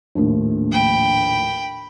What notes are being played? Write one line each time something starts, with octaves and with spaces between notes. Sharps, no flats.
A#1 D#2 A2
G5 B5